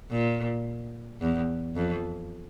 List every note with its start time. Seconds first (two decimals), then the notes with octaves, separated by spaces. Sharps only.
0.11 A#2
1.21 E2
1.76 F2